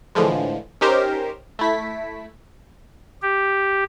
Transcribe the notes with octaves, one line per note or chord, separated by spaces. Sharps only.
A2 D3 E3 F3 G#3
C#4 D#4 G4 A#4 C5
A3 E4 B6
G4